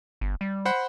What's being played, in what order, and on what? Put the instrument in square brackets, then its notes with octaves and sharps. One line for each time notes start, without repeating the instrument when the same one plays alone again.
[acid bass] G1
G3
[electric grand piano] C5 F#5 B5